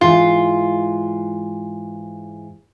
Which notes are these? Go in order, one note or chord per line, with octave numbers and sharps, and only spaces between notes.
G#2 E3 F4